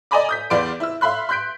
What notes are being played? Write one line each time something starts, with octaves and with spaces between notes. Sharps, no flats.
D5 D#5 G#5 A#5 B5 D6
D#6 G6 B6
E2 B4 D5 F5 C6 D7
E4 E6
E5 F5 B5 C6 F#6
C6 F#6 G6 B6 D7